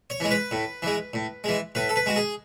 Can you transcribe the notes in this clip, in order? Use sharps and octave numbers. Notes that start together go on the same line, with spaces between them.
C#5
E3 G#3
B4
A2
E3 G#3
A2
E3 G#3
A2 B4
A4
B4
G#3 F#4
G#4